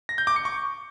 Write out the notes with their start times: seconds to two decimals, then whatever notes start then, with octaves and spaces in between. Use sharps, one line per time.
0.09 A#6
0.18 G6
0.27 D6
0.36 C#7
0.45 C#6